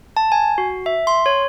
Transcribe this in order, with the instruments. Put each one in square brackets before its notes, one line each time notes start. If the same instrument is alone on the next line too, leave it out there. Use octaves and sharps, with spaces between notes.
[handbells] A5
G#5
F#4
E5
C6
C#5